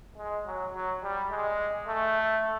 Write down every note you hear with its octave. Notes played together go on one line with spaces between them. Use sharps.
G#3
F#3
F#3
G3
G#3
A3